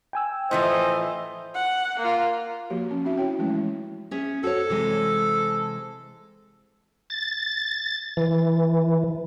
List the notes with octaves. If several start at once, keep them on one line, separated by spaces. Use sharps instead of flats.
G5 G#5 E6
A2 E3 F3 C5 D#5
F#5
A#3 F4
F3 A#3 F#4 G4
F3 C#4
C4 C#4 D#4 F#4 E5
E4 F#4 C#5 G5
E3 F3 G#3 A3 C#4 E4
C#4 G#4 E5
F#4 A4 C#5
C3 E3 G#3
A6
E3